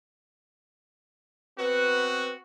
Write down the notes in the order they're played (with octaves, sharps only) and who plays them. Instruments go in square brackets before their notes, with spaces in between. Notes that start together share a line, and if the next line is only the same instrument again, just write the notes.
[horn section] B3 C4 F#4 [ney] B4